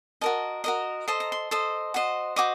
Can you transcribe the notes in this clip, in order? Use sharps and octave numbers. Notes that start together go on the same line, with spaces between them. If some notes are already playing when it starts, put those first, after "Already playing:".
F#4 A#4 D#5 A5
F#4 A#4 D#5 A#5
A4 C5 D#5 C6
A#5
C6
A4 C5 D#5
F#4 C5 D#5
F#4 C5 D#5 D6